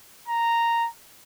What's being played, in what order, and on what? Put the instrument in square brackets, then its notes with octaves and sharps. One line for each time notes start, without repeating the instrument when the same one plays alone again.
[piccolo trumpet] A#5